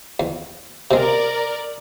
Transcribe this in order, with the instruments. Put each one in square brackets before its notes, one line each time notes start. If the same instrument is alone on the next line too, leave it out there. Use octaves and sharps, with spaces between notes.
[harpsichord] E2
[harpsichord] C3 G#3 [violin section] A#4 D5